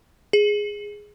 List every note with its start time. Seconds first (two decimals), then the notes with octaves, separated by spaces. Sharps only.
0.33 G#4